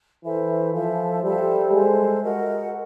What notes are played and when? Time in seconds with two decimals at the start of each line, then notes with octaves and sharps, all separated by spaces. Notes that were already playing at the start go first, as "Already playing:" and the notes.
0.24 E3 A4 C5 E5
0.73 F3 A4 C5 E5
1.23 G3 A4 C5 E5
1.72 G#3 A4 C5 E5
2.22 F#4 A#4 D#5 F#5